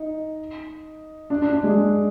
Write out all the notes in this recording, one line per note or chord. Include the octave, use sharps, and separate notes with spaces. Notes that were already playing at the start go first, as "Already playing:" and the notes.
Already playing: D#4
D4
D4
D4
G#3